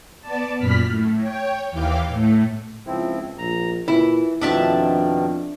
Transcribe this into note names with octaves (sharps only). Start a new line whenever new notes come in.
B3 D5 A5
F#2 A#2 B5 F6 B6
A2
C#5 G5
D#2 E3 F5 G5 D6
A2 A3
C#2 F3 C4 E4
A#1 A#5
A#2 E3 E4
F2 B2 D#3 F3 D4 E5 A5